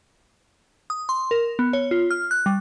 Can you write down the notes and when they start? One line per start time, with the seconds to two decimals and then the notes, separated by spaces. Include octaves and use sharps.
0.90 D#6
1.09 C6
1.31 A#4
1.59 B3
1.73 C#5
1.91 F4
2.11 F6
2.31 F#6
2.46 G3